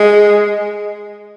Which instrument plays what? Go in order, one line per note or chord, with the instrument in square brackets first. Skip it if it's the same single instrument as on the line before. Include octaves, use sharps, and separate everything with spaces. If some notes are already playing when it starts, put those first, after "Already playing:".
Already playing: [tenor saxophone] G#3